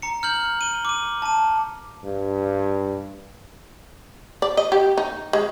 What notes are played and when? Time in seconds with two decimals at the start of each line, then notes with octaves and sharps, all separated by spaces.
0.02 A#5 C#7
0.23 F6 G6 F#7
0.61 D#7 G7
0.85 D6 D#7
1.22 A5 D#7
2.04 G2
4.42 D5
4.57 D#5
4.72 G4
4.98 D#4
5.33 G#3